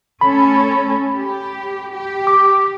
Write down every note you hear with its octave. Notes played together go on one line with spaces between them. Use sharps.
A3 C#4 A4 B5
G4
G4
D6